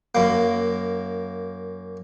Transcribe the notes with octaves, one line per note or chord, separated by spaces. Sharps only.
F#2 A#3